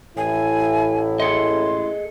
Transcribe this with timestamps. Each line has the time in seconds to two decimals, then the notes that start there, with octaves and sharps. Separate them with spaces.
0.17 A1 A2 E4 G#5
1.20 G#4 A4 D#5 C6